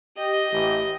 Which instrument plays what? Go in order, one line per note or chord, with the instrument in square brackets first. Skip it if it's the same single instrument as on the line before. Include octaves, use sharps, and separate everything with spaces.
[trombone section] G4 [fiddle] D#5
[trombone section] A1 G4